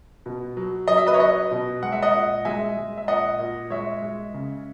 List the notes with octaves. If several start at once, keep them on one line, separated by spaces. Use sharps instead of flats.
B2
F#3
F#3 D#5
E5
B4 D#5
C#5
F#3 B4 D#5
B2
G#3 F#5
E5
D#5 F#5
A#2
G#3 E5 G#5
G#3
E5
A#2 D#5 F#5
A#2
G#3 C#5 E5
G#3
C#3